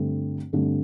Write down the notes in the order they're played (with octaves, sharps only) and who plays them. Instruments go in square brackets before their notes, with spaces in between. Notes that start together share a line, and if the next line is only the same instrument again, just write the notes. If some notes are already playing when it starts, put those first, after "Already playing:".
Already playing: [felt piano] G2 D3 A3 C4
G2 D3 A3 C4